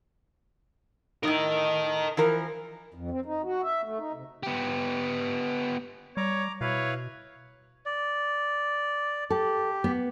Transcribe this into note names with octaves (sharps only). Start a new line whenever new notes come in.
A2 D#4 A#4 D#5
E3 F3 A#4
F2
C4
D#4
F#4
E5
A3
D#4
C3
B3 G4
G3 C#5 A#5 D6
B2 E4 B4 C#5 F5
D5
G4 A4
B3